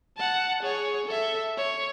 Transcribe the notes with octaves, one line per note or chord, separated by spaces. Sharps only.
F#5 A5
G#4 C#5
A4 E5
C#5